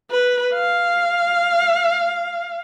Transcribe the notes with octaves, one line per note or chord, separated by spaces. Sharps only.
B4
F5